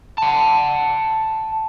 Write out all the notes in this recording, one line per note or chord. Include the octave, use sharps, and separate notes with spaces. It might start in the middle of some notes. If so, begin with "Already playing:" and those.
F#5 A5